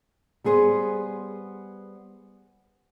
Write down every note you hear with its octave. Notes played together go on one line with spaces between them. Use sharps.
G3 B3 G#4 C5